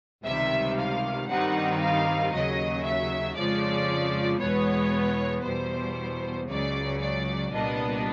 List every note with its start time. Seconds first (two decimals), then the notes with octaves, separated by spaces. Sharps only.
0.24 C#2 C3 D#3 G3 E5
0.76 F5
1.28 G2 D#3 G3 C4 D#4 F#5
1.80 F5
2.32 D#2 C#3 F#3 D#5
2.84 E5
3.36 F2 C#3 F3 G#3 D5
4.40 E2 B2 G#3 B3 C#5
5.44 E2 B2 G3 C5
6.48 C#2 C#3 F#3 D5
7.00 D5
7.52 C2 A#2 G3 B3 D4 D#5